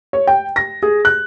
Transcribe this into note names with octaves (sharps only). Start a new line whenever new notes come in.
C#5
G5
A#6
G#4
F#6